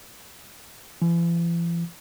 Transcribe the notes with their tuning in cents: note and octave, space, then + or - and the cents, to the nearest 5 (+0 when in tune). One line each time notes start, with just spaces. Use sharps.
E3 +45